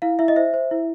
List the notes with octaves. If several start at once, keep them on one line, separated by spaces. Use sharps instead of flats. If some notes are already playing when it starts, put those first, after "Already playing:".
E4 F5
E4 E5
D#5
C5 E5
C5
E4